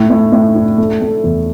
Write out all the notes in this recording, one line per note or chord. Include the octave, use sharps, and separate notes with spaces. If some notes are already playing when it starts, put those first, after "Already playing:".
Already playing: A2
A2
A2
D4
A3
A3
E2